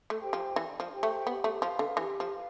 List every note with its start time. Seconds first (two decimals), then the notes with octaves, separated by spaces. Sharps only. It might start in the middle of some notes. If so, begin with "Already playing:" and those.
0.10 A3
0.21 G4 C5 G5
0.33 F3
0.56 E3 D4
0.80 F3
0.91 G4 C5 G5
1.03 A3
1.27 B3 G4
1.44 A3
1.61 F3 B4 F5
1.79 D3
1.96 E3 G4
2.20 F3
2.31 B4 F5